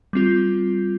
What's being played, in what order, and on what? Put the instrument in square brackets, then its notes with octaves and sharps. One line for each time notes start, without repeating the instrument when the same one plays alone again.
[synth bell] G3 C4 F4